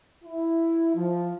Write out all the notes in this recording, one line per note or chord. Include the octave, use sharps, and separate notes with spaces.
E4
F3